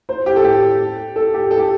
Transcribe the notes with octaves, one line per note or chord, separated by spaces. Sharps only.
C5
G4
A4
G4
A4
G4
A4
G4